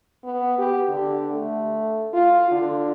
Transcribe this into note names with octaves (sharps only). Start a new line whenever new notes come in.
B3
G4
D3
A3
F4
D3